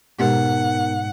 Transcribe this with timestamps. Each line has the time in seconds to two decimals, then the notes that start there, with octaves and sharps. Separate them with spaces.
0.19 G#2 B2 G#3 B3 D#4 G4 A#4 F#5